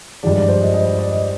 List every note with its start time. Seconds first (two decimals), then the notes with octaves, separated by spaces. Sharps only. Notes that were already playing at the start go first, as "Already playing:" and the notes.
0.23 G2 F3 G#3 D5
0.35 D5
0.48 C5
0.61 D#5
0.74 D#5
0.86 D5
0.99 D5
1.12 D#5